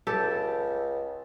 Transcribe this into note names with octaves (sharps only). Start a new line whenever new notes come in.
C#2 G4 A4